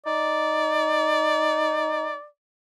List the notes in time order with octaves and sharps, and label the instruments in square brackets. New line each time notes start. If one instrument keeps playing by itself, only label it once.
[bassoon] D#4 [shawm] D5